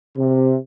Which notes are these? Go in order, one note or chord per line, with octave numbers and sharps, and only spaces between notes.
C3